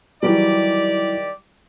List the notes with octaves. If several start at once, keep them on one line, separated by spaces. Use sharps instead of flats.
D#3 E3 F#3 G3 G4 D5